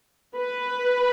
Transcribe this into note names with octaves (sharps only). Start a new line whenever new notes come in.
B4